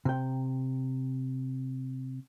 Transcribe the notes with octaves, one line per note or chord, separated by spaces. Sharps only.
C3 G5